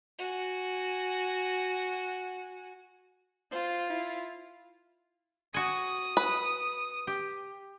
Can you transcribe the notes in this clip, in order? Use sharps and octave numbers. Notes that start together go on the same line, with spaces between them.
F#4 G#5
F4 C5
E4
F#4 G#5 D#6
B4
G4